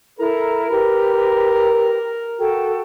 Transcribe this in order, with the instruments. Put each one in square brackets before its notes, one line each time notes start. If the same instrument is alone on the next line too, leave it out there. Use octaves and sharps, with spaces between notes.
[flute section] E4 A4 [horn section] A#4
[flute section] G4 B4
F#4 A4 G5